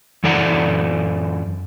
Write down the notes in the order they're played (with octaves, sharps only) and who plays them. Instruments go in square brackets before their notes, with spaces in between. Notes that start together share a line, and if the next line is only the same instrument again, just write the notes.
[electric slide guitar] F#2 E3 A4 D5 F#5 A#5